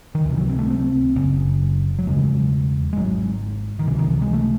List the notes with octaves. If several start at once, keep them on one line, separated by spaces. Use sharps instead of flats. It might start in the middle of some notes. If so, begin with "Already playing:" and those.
D#3
C#2 C3 E3
F#3
C4
A3
C4
F#1 F#2 C#3
F#3
E1 E2 C#3 G#3
G#3
G#1 G#2 F#3
D#3
C#2 C3 E3
D#3
E3
G#3
A3